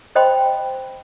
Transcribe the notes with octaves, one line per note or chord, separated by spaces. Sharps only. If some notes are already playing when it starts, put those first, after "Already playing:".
C5 D#5 G5 B5 C6